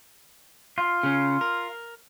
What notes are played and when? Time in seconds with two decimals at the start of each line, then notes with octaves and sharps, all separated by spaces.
0.78 F4
1.03 C#3 C#4
1.41 A#4